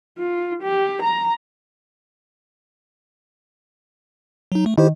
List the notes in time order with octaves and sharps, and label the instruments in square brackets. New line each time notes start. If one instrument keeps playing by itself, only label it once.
[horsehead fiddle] F4
G4
A#5
[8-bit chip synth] F#3 D#4
A3
[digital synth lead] D#3 [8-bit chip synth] E4 G4 C5